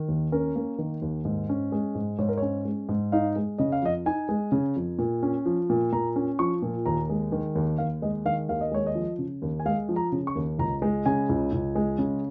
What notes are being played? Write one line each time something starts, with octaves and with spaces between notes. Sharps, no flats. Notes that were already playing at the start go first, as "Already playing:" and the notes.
Already playing: D#3
D#2
C#4 A#4
A#3
D#3
D#2
G#2
C#4
G#3
G#2
G#2 C#5
A#4
C#4 C#5
G#3
G#2
D#4 F5
G#3
C#3 D#5
F5
F2 D#5
D#4 G#5
G#3
C#3
F2
A#2
C#4
F3
A#2
A#2 A#5
C#4
F3 C#6
A#2
D#2 A#5
G#3
D#3
D#2
D#2 F5
G#3 D#5
D#3 F5
D#2 F5
D#5
G#3 C#5
D#5
F3
C#3
D#2
G#5
G#3 F5
F3
A#5
C#3
C#6
D#2
C#2 A#5
G#3
C#3 G#5
C#2
C#2
G#3
C#3